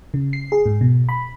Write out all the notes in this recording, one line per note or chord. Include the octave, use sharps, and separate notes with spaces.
C#3
C7
G#4
G#2
B2
B5